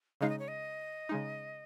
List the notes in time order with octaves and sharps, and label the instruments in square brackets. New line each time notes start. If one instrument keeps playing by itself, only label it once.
[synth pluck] C#3 G#3 D#4 [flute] F5
[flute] D#5
C#5
D#5
[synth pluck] C#3 G#3 D#4